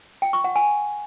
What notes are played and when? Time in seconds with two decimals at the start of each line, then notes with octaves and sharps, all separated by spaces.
0.22 G5
0.33 C#6
0.44 F#5
0.56 G#5